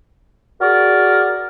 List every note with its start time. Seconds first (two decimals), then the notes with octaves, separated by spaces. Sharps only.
0.62 F#4 G#4 A#4 D5